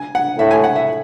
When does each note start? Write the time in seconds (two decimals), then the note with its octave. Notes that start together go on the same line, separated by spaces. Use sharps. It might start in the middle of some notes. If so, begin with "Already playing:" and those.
Already playing: G#5
0.15 F#5
0.38 A2 E5
0.51 G#5
0.64 F#5
0.76 E5